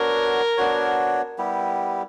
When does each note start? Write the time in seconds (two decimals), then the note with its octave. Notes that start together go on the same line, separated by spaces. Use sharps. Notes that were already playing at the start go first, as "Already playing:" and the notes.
Already playing: B3 D4 F#4 A#4 C#5
0.57 B3 D4 F#4 C#5
1.38 G3 B3 E4 G4